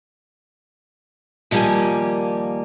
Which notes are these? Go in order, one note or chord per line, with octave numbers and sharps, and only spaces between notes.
D#2 F3 G3 A#3 G#5